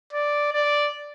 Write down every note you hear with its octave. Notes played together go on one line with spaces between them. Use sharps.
D5
D5